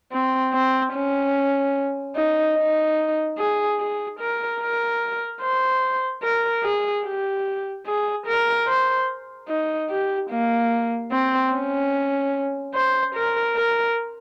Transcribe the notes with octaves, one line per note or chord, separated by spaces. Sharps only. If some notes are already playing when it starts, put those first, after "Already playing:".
C4
C4
C#4
D#4
D#4
G#4
G#4
A#4
A#4
C5
A#4
G#4
G4
G#4
A#4
C5
D#4
G4
A#3
C4
C#4
C5
A#4
A#4